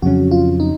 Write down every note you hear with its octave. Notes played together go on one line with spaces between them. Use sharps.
F2 C#3 F#3 C#4 F#4
F4
D#4